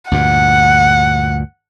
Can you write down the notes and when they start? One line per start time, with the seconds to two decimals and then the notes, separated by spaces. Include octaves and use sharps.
0.11 D2 G2 A#2 F#5